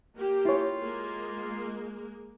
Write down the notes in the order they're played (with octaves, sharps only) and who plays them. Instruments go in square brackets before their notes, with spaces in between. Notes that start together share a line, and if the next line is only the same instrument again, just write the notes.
[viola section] A#3 G4
[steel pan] E4 C#5 [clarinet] F4
[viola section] G#3 A#3